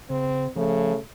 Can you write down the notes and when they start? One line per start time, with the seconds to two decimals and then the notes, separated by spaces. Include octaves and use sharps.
0.10 C#3 C4
0.56 C#3 F3 A3